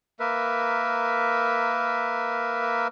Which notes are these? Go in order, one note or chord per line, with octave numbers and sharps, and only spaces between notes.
A#3 A#4 B4 E5